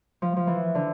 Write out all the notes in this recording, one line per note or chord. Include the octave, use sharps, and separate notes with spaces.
F3
F3
E3
D3